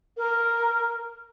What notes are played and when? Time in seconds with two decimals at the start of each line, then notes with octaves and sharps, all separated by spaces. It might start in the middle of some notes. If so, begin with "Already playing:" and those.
0.17 A#4